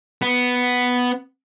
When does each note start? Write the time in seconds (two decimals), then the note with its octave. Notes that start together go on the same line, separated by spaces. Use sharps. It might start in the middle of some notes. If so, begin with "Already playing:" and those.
0.22 B3